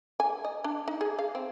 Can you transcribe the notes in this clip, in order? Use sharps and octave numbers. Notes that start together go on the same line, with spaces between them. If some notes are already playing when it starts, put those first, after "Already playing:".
G#5
D#5
D4
D#4
G#4
F5
C4